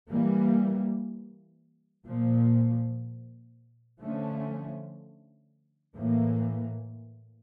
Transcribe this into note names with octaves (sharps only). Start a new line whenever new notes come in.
E3 G3 A#3
A#2 F3 A#3
D3 F3 A3 C#4
A2 E3 A#3